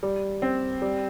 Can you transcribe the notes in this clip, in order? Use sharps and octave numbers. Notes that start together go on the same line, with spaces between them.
G3
C4
G3